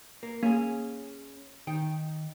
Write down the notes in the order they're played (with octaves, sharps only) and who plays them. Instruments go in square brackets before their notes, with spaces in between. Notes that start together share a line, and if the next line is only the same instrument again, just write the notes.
[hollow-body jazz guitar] A#3
[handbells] A#3 [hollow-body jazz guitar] C#4 G#4
[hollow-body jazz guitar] D#3 D#4 G5